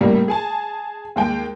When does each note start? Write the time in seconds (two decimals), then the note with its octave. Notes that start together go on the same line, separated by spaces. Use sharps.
0.01 A2 C#3 G3 A#3
0.28 G#4 G#5 A5
1.16 D#2 G#3 G5